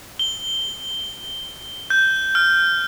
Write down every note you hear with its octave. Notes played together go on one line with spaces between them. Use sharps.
G7
G6
F6